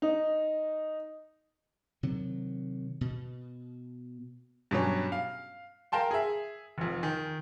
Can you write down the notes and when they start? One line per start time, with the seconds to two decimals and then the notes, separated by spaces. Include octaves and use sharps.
0.02 D#4
2.03 C3 D#3 F#3
3.01 B2
4.71 G2 B2 F#3 C#4
5.12 F5
5.92 A#4 F5 G5 A5 C6
6.11 G#4 E5
6.78 F1 F2
7.03 D#3